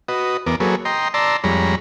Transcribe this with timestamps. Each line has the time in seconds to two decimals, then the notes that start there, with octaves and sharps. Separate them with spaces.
0.08 F#4 B4 D#5
0.47 E2 B3 A#4 D6
0.60 F#3 A#3 G#4 A4 B4 C#5
0.85 D#5 G5 A#5 C6
1.14 D5 A5 A#5 C6 E6
1.44 F2 G3 G#3 C#5 A#5 B5